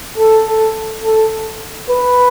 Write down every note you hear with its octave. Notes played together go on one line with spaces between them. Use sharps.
A4
A4
A4
B4